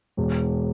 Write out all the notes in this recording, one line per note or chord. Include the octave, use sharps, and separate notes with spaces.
E1